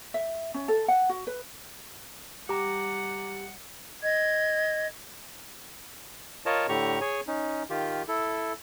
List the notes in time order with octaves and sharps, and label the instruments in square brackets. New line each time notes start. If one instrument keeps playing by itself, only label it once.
[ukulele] E5
C#4
A4
F#5
F#4
B4
[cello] G3 F#5 [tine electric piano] G4 [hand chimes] A#5 D6
[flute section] D#5 G#6
[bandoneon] F4 A#4 C#5 D#5 A5
A2 D3 G4 A#5 C#6
G#4 C#5 G#5
C#4 D#4
D#3 F4 G4
E4 A4